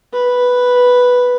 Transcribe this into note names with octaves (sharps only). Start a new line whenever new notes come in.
B4